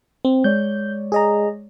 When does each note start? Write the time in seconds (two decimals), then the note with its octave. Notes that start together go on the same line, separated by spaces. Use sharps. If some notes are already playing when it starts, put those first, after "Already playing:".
0.25 C4
0.44 G#3 C#5 D5 G6
1.12 G#4 D#5 A#5